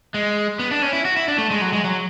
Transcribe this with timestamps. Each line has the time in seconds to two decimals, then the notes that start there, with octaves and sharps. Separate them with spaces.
0.14 G#3
0.59 B3
0.71 D4
0.82 C#4
0.93 E4
1.05 F#4
1.17 E4
1.28 D4
1.38 A3
1.51 G#3
1.61 F#3
1.73 G#3
1.84 F#3